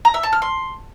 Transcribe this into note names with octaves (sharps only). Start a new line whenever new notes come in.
A#5
E5
A5
F6
C6